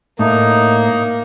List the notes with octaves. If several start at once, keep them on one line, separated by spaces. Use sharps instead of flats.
A2 A#3 D#4